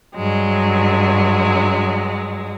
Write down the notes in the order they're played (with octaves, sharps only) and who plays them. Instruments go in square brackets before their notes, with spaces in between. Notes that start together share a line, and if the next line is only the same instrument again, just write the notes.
[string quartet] G2 F#3 G#3